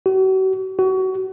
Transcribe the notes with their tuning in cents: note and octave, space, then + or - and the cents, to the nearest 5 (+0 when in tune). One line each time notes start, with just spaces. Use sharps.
F#4 +45
F#4 +30